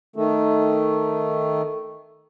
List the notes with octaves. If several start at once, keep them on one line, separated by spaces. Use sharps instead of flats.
D#3 A3